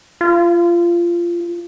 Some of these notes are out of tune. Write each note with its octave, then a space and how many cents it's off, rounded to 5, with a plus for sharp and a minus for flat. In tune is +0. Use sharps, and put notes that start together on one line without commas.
F4 -20